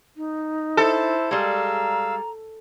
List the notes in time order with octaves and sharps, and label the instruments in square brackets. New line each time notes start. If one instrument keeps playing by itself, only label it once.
[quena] D#4
[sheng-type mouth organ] E4 C5 [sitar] A4
[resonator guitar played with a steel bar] G3 G#3 [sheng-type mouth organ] F5 E6 [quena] A#5